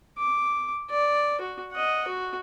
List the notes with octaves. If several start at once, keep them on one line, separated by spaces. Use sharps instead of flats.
D6
D5
F#4
D#5 F#5
F#4